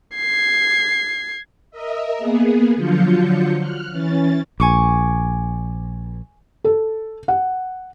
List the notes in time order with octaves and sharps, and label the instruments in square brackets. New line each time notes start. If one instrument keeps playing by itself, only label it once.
[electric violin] G#6 C7
[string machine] A#4 D#5 E5
A#3 B3 G#4
D3 F3 F#3 F4 G6 C#7
F6 F#6
E3 C#4 A6
[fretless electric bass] A#1 [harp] G#5 C#6 D6
[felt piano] A4
F#5